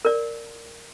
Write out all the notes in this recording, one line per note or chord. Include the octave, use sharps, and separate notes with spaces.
A#4 D5